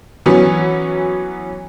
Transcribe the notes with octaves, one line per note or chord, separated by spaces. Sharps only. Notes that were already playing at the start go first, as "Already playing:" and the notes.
E3 F#3 B3 C#4